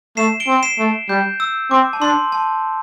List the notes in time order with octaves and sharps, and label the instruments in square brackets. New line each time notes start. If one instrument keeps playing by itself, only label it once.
[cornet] A3 [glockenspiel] C7 E7
[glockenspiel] D7 G7
[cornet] C4
[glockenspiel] C7 E7
[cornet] A3
[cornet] G3 [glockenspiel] G6
[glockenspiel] E6
[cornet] C4 [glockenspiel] D6
[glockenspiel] A5
[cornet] D4 [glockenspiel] C6
[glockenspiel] A5